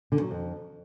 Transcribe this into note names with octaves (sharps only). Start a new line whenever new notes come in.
D3
F#3
F2